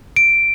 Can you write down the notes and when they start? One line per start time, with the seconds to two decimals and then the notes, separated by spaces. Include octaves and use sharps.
0.16 D7